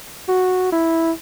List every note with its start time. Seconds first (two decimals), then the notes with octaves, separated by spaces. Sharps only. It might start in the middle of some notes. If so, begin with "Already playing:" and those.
0.29 F#4
0.72 E4